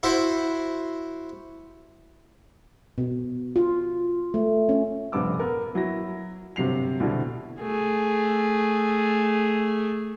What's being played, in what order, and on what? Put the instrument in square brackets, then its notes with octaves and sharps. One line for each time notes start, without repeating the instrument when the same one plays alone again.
[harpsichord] E4 F#4 C5
[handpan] B2
F4
A3
C#4
[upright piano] F1 A#1 G2 B3 D6 E6
B3 A#4
F#3 E4 A#6
G1 C3 F#3 C7 F7
C2 B2 D3 E4
[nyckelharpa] A3 G#4